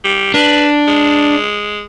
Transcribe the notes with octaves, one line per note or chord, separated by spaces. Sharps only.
G3
D4 B4
G#3